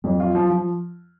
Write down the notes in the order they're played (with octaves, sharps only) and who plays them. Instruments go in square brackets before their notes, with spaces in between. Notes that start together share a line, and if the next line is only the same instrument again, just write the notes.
[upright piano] F2 [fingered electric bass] F#3
[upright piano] F4
F3
F3